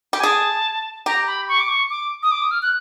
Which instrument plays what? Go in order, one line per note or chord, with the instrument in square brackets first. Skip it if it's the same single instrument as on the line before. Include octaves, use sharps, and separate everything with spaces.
[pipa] G4
[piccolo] G#5
[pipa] G#4 [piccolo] A5
[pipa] G4 [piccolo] A#5
[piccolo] B5
C#6
D6
C#6
D6
D#6
D6
D#6
F6
F#6